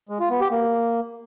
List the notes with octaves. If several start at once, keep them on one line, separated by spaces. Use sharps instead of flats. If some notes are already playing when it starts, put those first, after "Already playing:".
G#3
F4
B3
G4
A#3